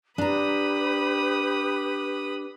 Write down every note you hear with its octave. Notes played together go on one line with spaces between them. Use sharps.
D4 G4 B4 A#5 B5 D#6